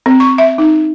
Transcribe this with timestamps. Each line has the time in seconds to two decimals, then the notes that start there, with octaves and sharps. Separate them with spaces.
0.06 C4
0.20 C#6
0.38 E5
0.58 D#4